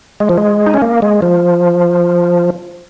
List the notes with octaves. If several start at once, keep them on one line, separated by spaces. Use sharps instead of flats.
G#3
F3
G#3
D#4
C#4
A#3
G#3
F3